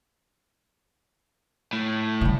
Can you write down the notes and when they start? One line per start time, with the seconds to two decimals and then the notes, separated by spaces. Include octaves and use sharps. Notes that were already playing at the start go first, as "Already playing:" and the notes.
1.73 A2
2.21 C#3 G3